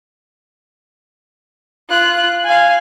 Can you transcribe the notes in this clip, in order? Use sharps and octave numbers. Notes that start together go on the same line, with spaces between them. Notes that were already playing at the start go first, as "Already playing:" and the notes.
F4 F#6
F5 G#5